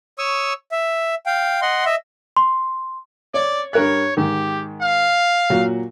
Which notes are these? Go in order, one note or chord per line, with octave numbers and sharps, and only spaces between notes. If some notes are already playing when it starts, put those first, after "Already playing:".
C#5 C#6 D#6 E6
E5
F5 G5
D#5 F#5 C6
D#5 E5
C6
C#5 D5
G2 A#4 C#5 F#6
G#2 D#3 G4
F5
A#2 F#3 F#4